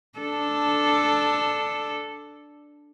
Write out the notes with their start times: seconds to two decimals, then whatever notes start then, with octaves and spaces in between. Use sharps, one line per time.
0.19 D4 A4